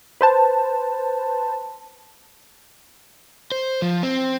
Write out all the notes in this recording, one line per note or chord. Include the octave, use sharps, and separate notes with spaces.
B4 C5 A5
C5
F3
C4